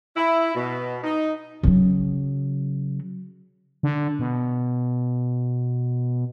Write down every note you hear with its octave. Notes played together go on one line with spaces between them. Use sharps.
E4
B2
D#4
C#3 F#3
D3
B2